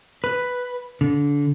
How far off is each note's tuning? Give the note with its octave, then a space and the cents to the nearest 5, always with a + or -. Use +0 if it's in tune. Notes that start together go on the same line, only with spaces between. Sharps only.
B4 +5
D3 -25